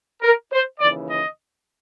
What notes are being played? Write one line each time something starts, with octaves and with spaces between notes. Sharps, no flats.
A#4
C5
D#2 C#3 E3 D5
D#5